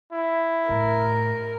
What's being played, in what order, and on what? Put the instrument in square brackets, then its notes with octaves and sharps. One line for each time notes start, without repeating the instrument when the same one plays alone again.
[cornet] E4
[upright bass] A2 [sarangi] A#4